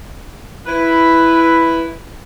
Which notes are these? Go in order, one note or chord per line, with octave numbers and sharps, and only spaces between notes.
E4 B4